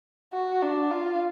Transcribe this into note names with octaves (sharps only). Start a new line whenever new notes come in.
F#4
D4
F4